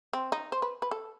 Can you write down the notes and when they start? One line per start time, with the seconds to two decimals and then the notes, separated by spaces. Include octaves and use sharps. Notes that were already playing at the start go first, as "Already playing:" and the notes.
0.13 C4
0.32 D#4
0.52 C5
0.62 B4
0.82 B4
0.91 A4